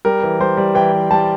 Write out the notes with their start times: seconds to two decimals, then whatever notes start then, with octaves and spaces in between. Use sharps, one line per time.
0.05 G3 A#4
0.23 E3
0.40 G3 C5
0.57 G3
0.75 E3 G5
0.92 E3
1.11 G3 A5